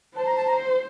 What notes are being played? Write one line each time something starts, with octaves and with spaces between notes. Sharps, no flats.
C5 A5
A#5
A5
A#5